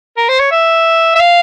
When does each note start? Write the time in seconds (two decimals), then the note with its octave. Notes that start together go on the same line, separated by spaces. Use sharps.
0.17 A#4
0.29 C5
0.40 C#5
0.52 E5
1.16 E5
1.20 F5